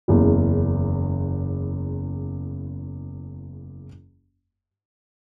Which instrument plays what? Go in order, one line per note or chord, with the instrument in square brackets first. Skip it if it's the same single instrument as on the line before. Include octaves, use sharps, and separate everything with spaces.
[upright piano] F#1 E2 C#3